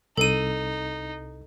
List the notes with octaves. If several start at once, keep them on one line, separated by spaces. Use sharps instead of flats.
C2 D#4 A4 D#7